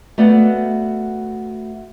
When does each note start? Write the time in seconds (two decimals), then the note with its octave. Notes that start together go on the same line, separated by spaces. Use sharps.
0.18 A3 B3 F#4 D5 F5 F#5